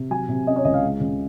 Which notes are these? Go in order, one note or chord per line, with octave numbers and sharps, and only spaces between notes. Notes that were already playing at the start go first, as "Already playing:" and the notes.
Already playing: C3
F#3 G#5
C3
C#4 D#5
C#5
C#2 D#5
F5
G#3
C#3